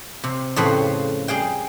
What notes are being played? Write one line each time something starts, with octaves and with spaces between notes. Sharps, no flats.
C3
F2 A2 C#3 B4 C5 B5
G3 G#4 F5 G5